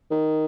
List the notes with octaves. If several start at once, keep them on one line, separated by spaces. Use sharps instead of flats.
D#3